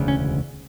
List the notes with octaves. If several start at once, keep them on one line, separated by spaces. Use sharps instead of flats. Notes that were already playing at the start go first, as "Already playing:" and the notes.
Already playing: E1 D2 C#3
C#4